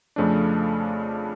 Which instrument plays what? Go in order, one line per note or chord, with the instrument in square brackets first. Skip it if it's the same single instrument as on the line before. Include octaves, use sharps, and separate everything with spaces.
[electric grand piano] F2 C#3 F3 A3 D4